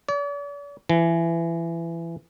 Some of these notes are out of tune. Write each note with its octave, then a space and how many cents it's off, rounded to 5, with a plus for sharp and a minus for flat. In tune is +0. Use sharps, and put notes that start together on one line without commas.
D5 -45
E3 +25